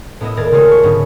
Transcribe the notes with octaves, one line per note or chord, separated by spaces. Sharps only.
A2 B3 E4 D#5
D#1 A#3 A#4 G#6 A6
C#3 G#3 A3 F4 G#4 C#5
A5 C#6
G#2 D3 F#3 B3 C#4